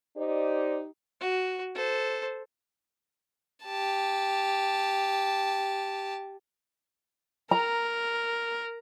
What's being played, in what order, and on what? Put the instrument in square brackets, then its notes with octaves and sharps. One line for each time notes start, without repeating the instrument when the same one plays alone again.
[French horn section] D#4 G4 [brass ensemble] C5 D5
[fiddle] F#4
A4 C5
[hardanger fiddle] G4 A5
[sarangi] A#4 [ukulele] A#5